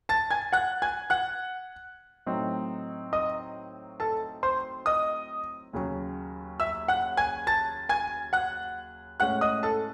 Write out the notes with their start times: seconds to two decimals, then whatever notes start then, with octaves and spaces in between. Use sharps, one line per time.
0.09 A5 A6
0.31 G#5 G#6
0.53 F#5 F#6
0.82 G#5 G#6
1.10 F#5 F#6
2.26 A2 F#3 C4 D#4
3.13 D#5 D#6
4.00 A4 A5
4.43 C5 C6
4.86 D#5 D#6
5.73 D#2 C#3 F#3
6.60 E5 E6
6.88 F#5 F#6
7.17 G#5 G#6
7.47 A5 A6
7.89 G#5 G#6
8.33 F#5 F#6
9.20 A2 G#3 C#4 F#5 F#6
9.41 D#5 D#6
9.63 A4 A5